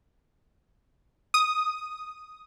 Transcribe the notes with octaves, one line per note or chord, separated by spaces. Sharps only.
D#6